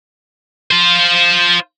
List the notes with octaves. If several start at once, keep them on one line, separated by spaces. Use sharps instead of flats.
F4 C5